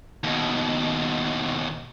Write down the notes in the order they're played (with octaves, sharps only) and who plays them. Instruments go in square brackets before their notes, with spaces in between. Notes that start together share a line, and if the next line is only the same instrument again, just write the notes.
[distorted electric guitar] D#2 B2